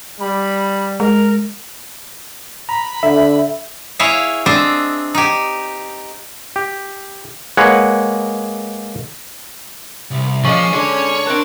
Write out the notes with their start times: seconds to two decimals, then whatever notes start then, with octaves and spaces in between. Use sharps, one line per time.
0.20 G3 B5
1.00 G#3 A#4
2.69 A#5 B5
3.03 D3 E5
3.99 E4 G#4 C#5 E5 F5
4.46 C4 D4 C5 D#5 E5
5.15 D#4 G4
6.56 G4
7.57 G#3 A#3 G#4 B4 C#5 F#5
10.11 C2
10.45 A#2 F3 G#3 C#4 C#6 F#7
10.73 D3 G#3 C#5
11.27 C4 D4 A#4 A5 F#6 D7